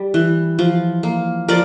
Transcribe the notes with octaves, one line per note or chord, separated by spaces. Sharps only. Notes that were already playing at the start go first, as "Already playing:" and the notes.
Already playing: G3
E3
F3
A#3
F3 A#4 D5